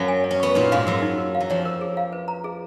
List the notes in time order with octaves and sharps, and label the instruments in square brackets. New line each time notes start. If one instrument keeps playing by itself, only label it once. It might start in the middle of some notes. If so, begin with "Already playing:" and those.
Already playing: [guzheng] F#2 F#3 A#3 C#4
[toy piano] G#5
C#5
[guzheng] C#4
[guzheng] B3 [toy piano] C#6
[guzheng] A#2 A#3 [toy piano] D#4
[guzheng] G#2 G#3 [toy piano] F5
[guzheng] F#2 F#3 [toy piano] A#4
[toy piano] D#4
A#4
F5
[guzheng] F#3
[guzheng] F2 F3 [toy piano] C#5
[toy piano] A#4
G#4
F5
B4
A#5
G#4